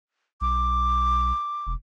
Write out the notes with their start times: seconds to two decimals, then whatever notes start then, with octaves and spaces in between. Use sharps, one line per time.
0.41 B1 D6
1.67 E1